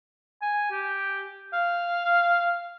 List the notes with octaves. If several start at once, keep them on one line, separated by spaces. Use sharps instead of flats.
G#5
G4
F5